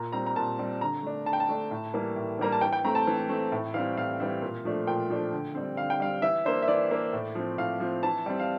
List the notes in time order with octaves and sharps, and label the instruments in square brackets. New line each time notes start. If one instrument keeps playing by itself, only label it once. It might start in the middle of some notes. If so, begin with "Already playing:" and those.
Already playing: [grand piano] A#2 A#5
G3 C4 A#5
A#5
A#2 A5
G3 C4
D3 A#5
A3 D4
D3 A5
G5
A5
A3 D4
A2
E3 G3 A#3
A2
E3 G3 A#3 A#5
A5
E3 G5
G5
A3 C4 A#5
A5
E3
A3 C4
A2
E3 G3 C4 F5
A2 F5
E3 G3 C4
A#2
F3 A3 D4
A#2 G5
F3 A3 D4
D3
G3 C4
D3 F5
G5
G3 C4 F5
E3 E5
A#3 D4 C5
E5
E3 D5
A#3 D4
A2
F3 C4
A2 F5
F3 C4
E3 A5
G3 C4
F5